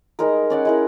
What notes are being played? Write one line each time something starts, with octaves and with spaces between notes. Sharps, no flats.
G3 G#3 D#4 A#4
C#4 D5 F#5
G#3 E4 A#4